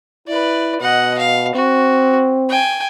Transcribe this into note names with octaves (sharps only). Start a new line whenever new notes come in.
E4 B4 D5
B2 D#5 F#5
F5
C4 F#4
G5 G#5